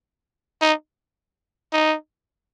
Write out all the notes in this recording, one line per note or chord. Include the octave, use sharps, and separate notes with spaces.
D#4
D#4